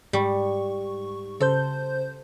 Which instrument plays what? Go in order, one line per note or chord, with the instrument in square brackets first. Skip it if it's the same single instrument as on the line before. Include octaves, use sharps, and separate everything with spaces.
[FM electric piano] G#2 C#6 [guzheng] G3
[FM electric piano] C#3 C5 G6 [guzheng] A4